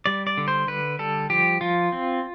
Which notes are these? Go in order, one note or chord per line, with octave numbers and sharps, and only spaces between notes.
G3 D5
D5
D3
C5
D3 B4
G3 A4
F3 G4
F3 F4
C4